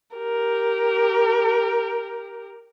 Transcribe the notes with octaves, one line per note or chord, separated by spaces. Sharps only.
G4 A#4